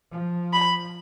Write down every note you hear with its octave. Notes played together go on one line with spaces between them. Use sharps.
F3
B5